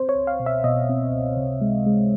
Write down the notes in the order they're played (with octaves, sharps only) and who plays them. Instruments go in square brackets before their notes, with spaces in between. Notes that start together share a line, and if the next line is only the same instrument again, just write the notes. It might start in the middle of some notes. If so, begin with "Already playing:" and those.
Already playing: [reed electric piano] C4 [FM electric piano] C5
[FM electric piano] C#5
[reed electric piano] C#2
[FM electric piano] F5
[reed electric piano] B2
[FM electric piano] E5
[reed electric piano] B2 [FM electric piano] D#5
[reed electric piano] C4
C#2
C3
G#3
G#3